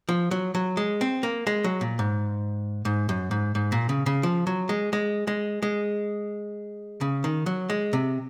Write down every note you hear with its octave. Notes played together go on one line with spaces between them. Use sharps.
F3
F#3
F#3
G#3
C4
A#3
G#3
F#3
A#2
G#2
G#2
F#2
G#2
G#2
A#2
C#3
C#3
F3
F#3
G#3
G#3
G#3
G#3
C#3
D#3
F#3
G#3
C3